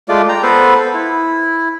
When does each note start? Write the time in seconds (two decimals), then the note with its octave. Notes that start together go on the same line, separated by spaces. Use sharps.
0.09 G#3 A3 F4 D5
0.29 G5 A#5
0.43 B3 A4 B4 C5
0.94 E4